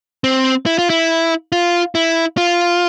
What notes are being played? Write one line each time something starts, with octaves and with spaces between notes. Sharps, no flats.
C4
E4
F4
E4
F4
E4
F4